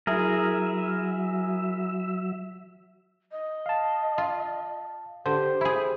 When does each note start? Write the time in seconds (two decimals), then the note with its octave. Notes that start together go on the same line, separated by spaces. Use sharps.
0.07 F#3 E4 G#4 A#4 E5
3.32 D#5
3.66 F5 A5
4.18 F4
5.26 D3 G4 C5
5.61 E4 G#4